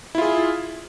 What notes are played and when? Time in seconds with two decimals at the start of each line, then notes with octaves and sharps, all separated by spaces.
0.15 E4
0.18 F4
0.22 G#4